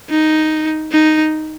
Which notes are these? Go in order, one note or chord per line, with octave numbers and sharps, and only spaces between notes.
D#4
D#4